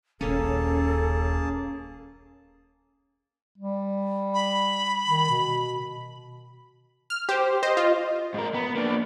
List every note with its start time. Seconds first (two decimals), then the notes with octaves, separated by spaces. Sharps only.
0.21 D#1 A#1 A#3 C#4 G#4 A4 A5
3.58 G3
4.34 B5
5.07 D#3
5.30 B2
7.10 F6
7.29 G4 C5
7.63 C5 D#5
7.77 F4
8.34 G#2 A#4
8.54 B3
8.75 A#3 D4